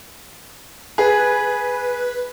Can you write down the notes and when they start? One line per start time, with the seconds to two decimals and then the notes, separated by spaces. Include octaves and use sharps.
0.98 G#4 B4